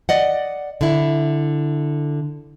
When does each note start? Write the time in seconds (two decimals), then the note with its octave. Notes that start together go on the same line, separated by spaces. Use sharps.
0.09 D5 D#5 F#5
0.81 D3 E4